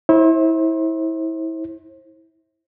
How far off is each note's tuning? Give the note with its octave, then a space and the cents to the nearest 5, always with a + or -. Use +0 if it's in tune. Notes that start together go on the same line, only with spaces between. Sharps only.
E4 -25 C5 +35